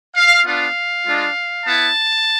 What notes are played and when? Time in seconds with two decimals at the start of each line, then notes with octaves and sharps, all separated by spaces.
0.16 F5
0.45 B3 D4 F4 F5
1.06 G#3 D4 F4
1.66 B3 E4 A5